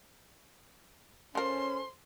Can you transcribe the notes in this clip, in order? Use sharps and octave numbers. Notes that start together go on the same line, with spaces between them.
F3 C#4 A4 A#4 C5 C6